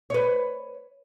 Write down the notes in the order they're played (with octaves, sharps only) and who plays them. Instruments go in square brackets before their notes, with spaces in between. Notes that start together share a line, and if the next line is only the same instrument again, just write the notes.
[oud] B4 C#5